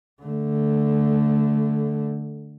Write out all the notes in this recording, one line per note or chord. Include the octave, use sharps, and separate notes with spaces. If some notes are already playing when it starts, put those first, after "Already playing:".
D3 A3